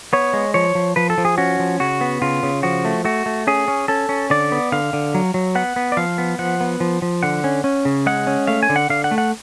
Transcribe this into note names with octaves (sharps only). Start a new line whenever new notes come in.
B3 C#5
G#3
F3 C#5
F3
F3 B4
A4
F3
G#4
C#4 F#4
F3
C#3 F#4
B3
C#3 F4
C#3
F3 F#4
A3
A3 F#4
A3
C#4 G#4
C#4
C#4 A4
C#4
D3 D5
B3
D3 F5
D3
F#3
F#3
B3 F#5
B3
D5
F3 F5
B3
F3 F#5
B3
F3
F3
D3 F#5
C#4
C#4
C#3
G#3 F#5
C#4
A3 F5
G#5
D3
F#5
D3 F5
F#5
A3
F#5